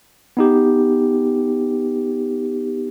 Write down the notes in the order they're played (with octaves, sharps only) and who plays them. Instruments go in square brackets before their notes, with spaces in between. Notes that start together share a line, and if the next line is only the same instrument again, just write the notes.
[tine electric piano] B3 D#4 G4